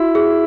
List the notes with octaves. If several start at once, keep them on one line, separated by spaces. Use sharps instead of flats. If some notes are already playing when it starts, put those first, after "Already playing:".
Already playing: E4 F#4
G#4